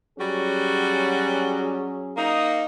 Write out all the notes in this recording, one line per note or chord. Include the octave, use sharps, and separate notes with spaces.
F#3 G3 C#4 F#4 G#4
A#3 D#4